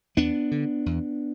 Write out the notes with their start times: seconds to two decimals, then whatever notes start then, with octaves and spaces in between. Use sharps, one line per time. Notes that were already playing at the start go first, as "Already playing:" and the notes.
0.17 E2 B3 D4
0.51 D3
0.86 E2